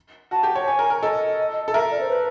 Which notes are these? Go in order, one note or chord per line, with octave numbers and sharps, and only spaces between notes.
F#4 A5
G4
C#5
C#5 G#5
A#4
A#4
A4 D#5
A4
A#4 E5
D5
C5
B4